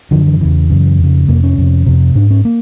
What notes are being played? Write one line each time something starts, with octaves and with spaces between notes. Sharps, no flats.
F#2 D3 F3
E3
E2 C#3 E3
F#2 C#3
F2
C#3
F2 C3 A#3
C#4
F2 C3
F2 C3
G#2 D4
C#4
A#3